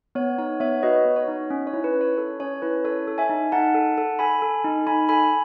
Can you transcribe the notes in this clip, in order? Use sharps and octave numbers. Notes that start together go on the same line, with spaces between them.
B3 C#5
D#4 C#5
B3 C#5 E5
F#4 B4 D#5
B3
C#5
D#4
C#4
C#5
E4
B4
C#4
C#5
A4
C#4 C#5
E4 B4
A4 C#5
A4
E5 G#5
D#4
D#4 F#5 A5
A4
A4
A4 G#5 B5
A4
D#4
D#4 G#5 B5
A4 G#5 B5